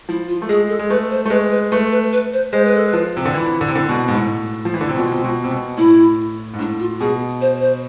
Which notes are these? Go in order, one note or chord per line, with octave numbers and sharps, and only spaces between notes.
F3 E4
F4
A3
G#3 G#4
A4
G#3
A3 B4
C5
A3
G#3 B4
B4
A3 B4
B4
B4
C5
G#3 C5
B4
A4
B4
F3
C3
D3
E3 E4
D3
C3
D3
B2
G#2
A2
F3
E3
D3
C3
B2 F4
C3
B2
C3
B2
A2 E4
G#2
A2 D4
F4
B2 G#4
C5
C5